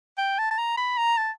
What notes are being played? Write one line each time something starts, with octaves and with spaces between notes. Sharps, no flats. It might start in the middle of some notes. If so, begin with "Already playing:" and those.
G5
A5
A5
A#5
B5
A#5
A5